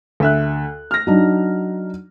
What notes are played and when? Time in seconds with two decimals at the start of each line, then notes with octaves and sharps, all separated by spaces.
0.20 D2 E5 F#6
0.91 F6 A#6
1.07 F#3 D4 D#4